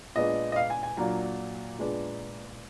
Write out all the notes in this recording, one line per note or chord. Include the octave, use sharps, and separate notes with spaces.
A#2 G#3 B3 D4 D#5
D#5
F5
G#5
G#5
A#2 F#3 A#3 D4 A#5
A#2 G#3 B3 D4